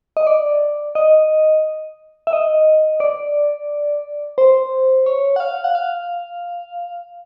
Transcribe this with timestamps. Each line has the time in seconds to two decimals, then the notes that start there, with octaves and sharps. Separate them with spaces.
0.17 D#5
0.27 D5
0.95 D#5
2.27 E5
2.33 D#5
3.00 D5
4.38 C5
5.06 C#5
5.36 F#5
5.40 F5
5.64 F#5
5.75 F5